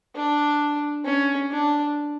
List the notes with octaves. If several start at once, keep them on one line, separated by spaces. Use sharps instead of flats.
D4
C#4
D4